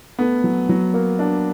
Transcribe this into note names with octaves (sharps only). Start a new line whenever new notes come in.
A3 B3
F#3
F#3
A#3
D4